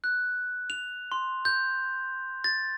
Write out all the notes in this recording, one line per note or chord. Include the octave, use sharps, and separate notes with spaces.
F#6
F7
C6
G6
A6